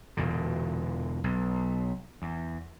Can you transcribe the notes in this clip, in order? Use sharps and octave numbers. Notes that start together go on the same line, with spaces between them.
E1 E2 A#2 D3
B1
E2